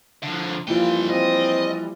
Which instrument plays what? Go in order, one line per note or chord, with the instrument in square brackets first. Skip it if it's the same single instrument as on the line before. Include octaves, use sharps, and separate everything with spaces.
[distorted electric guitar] D3 F3
[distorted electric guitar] D3 G5 [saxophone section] E3 F3 G3 [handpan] A#3 F4
[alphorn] C4 [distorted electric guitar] D#5